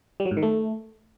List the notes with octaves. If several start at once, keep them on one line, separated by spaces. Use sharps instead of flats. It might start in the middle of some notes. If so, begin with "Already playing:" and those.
G3
F#3
G#2
D#3
A3